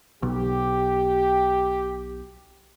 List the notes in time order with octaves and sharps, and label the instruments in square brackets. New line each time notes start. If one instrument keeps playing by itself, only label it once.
[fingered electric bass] B1 [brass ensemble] G4